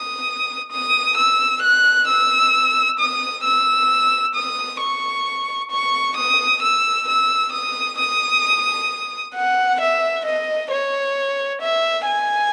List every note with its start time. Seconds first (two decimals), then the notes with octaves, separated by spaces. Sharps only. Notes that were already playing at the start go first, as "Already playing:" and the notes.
Already playing: D#6
0.71 D#6
1.17 E6
1.62 F#6
2.08 E6
2.99 D#6
3.44 E6
4.35 D#6
4.80 C#6
5.71 C#6
6.16 D#6
6.62 E6
7.08 E6
7.53 D#6
7.98 D#6
9.34 F#5
9.80 E5
10.25 D#5
10.71 C#5
11.61 E5
12.06 G#5